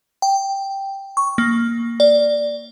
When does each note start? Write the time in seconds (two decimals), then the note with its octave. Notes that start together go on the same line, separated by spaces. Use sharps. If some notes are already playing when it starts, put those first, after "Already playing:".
0.22 G5
1.17 C#6
1.38 A#3
2.00 D5